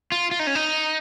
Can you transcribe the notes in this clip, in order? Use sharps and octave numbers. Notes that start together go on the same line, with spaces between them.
F4
F4
D#4
C#4
D#4